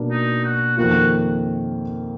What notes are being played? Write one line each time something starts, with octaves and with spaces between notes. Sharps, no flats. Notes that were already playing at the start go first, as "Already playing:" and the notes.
Already playing: B2 A#3 D4
D#4
F#4
F2 D#3 A#3 F4 F#4